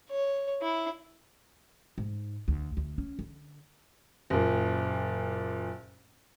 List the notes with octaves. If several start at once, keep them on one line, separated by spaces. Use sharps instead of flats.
C#5
E4
G#2
D2
D2
C#4
D3
F#1 A#2